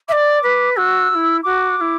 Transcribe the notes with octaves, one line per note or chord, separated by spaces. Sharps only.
D5 E5 D6
B4
F#4 E6
F#4
E4
F#4 D6
F#4
E4